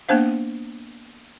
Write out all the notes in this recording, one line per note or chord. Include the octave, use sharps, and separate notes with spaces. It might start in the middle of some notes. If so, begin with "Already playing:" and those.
A#3 B3 D4 C5 F5